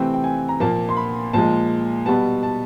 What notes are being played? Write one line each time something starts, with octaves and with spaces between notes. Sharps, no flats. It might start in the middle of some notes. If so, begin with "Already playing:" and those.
Already playing: C3 E3 A3 C4 G5
G5
G#5
A#5
A#2 F3 A#3 A5
C6
B5
A#2 F3 G#3 A5
B2 G3 B3 A5
A5